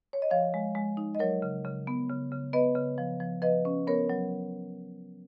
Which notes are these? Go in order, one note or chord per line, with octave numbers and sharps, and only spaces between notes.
C#5
D#5
F3 C#5 F5
G#3
G#3
D#4
D#5
F#3 A#4 C#5
C#3
C#3
B3
C#3
C#3
B3 B4 D#5
C#3
F3
F3
F3 B4 D#5
C#4
B3 A#4 C#5
F#3